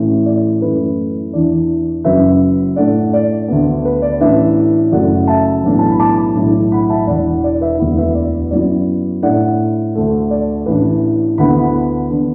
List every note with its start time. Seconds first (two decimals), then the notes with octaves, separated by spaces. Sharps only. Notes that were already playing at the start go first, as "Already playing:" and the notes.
Already playing: A1 A2 E3 A3
0.26 D5
0.61 F#2 E3 A3 E4 B4
1.33 E2 E3 D4 D5
2.04 F#1 F#2 F#3 B4 E5
2.76 A2 A3 D4 D5 F#5
3.13 D5
3.48 D2 D3 B3
3.85 B4
4.02 D5
4.20 A1 A2 E3 D4 B4 E5
4.92 F#1 F#2 F#3 A3 D5 F#5
5.27 E5 A5
5.64 B1 A2 E3 B3 D4
5.79 A5
5.90 B5
5.99 A5 D6
6.35 B1 A2 E3 D4
6.72 F#5 B5
6.90 E5 A5
7.07 E1 E2 E3 D5 F#5
7.44 D5
7.61 B4 E5
7.79 E1 D2 D3 B3 E4
7.98 B4 E5
8.15 D5
8.51 F#2 F#3 B3 E4 D5
9.23 A2 A3 D4 D5 F#5
9.95 D2 D3 A3
10.31 D5
10.66 A1 A2 E3 D4 B4
11.38 D2 D3 B3 E4 F#5 B5
12.11 D3 B3 D4